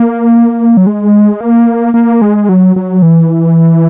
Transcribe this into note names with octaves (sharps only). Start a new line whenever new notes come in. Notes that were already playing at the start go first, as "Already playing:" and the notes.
Already playing: A#3
F#3
G#3
A#3
A#3
G#3
F#3
F#3
E3